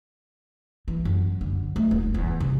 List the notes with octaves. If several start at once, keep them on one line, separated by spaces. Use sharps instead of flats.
E3
F#2
D3
A3
D#1
E2
C3